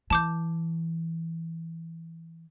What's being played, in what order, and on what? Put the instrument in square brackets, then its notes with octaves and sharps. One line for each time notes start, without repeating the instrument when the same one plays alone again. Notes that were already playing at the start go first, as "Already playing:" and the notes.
[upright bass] E3 [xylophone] A5 D6 G6